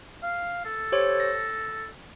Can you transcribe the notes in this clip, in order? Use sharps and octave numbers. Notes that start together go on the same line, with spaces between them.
F5
A4
G4 C5 C#5
A#6